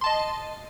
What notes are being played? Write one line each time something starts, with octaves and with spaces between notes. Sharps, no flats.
D#5 A5 C6